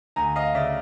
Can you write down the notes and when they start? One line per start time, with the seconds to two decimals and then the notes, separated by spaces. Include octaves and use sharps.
0.16 D2 G#5 A#5
0.36 D#5 F5
0.54 C#3 D5 E5